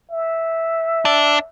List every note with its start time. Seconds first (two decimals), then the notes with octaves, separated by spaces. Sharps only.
0.11 E5
1.05 D4